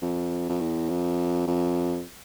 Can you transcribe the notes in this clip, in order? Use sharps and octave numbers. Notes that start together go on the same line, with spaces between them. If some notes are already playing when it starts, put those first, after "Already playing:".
F2
F2
E2
F2
F2